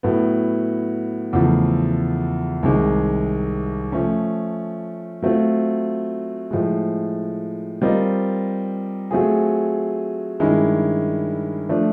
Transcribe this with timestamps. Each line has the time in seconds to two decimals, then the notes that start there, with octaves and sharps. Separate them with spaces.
0.03 A2 F#3 B3
1.33 E2 C#3 F3 A3
2.63 C2 C3 D#3 G#3
3.92 F3 A3 C#4
5.22 F#3 A3 C4 F4
6.51 A2 F3 G#3
7.82 G3 C4 F4 A#4 D#5
9.11 F#3 A3 C4 F4 G#4
10.40 G2 D#3 G#3 C#4 E4
11.69 F3 A3 D4